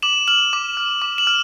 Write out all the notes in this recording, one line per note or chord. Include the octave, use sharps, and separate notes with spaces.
D6 E7 F#7
F6 E7 F#7
D6
F6
D6
E7 F#7
F6